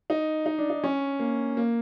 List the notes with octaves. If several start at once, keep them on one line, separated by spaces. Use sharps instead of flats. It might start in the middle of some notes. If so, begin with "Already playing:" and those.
D#4
D#4
D4
D#4
C#4
A#3
A#3